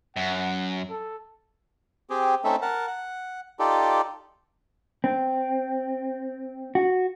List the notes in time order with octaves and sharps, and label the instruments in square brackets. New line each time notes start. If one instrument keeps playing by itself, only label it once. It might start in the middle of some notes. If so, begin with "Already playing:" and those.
[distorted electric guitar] F#2 [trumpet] F#5
[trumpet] A4
[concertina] C4 G4 G#4
A3 C4 C#4 D#4 A4 E5
A#4 F#5 A5
F#5
D#4 F4 G4 A4 D5
[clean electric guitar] C4
F#4